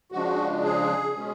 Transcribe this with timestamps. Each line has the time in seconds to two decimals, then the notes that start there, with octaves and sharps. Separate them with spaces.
0.12 C#3 F3 G#3 D4 F#4
0.64 G#4
1.13 B2 G#3 C#4